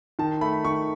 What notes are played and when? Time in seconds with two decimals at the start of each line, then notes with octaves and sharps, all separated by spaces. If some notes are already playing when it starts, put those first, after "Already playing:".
0.19 D#3 A5
0.41 A3 B5
0.65 D#3 C#6